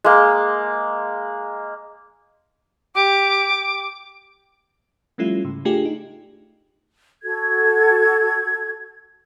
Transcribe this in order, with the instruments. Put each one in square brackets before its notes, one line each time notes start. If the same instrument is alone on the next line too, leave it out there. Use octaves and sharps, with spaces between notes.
[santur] G#3 A#3
[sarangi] G4 [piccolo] D6
[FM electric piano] F3 G3 A3 C#4 E4 F4
G#2 C#3
A3 D4 F4 G4 G#4
D#4
[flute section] F#4 A4 G#6